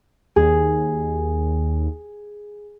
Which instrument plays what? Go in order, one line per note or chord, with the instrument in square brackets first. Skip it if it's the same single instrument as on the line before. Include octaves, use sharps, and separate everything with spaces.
[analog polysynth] D#2 [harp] G#4